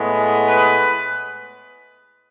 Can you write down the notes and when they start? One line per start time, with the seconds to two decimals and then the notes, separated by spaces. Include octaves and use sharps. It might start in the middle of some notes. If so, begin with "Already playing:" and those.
Already playing: A2 G#3 B3
0.49 B4